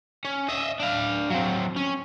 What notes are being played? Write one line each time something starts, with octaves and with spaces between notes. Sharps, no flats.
C#4
D#5 E5
D4 F5
F#3 C4
C#4